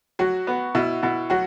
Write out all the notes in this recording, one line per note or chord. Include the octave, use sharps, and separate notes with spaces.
F#3 F#4
B3
B2 E4
B2 E4
F#3 F#4